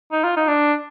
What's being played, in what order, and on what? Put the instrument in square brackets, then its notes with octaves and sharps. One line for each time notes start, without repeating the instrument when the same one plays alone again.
[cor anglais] D#4
F4
D#4
D4